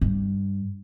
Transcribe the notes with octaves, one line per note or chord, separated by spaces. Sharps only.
G2